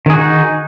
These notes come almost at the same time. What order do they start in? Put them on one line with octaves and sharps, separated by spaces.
D#3 G#4 F#4 D#4